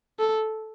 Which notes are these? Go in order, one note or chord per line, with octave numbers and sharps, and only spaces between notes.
A4